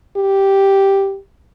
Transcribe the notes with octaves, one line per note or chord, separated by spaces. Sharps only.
G4